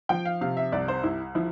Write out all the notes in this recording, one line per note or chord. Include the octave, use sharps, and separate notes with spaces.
F3 G5
F5
C3 F5
E5
C2 D5
C5
C2 E4
F3 E4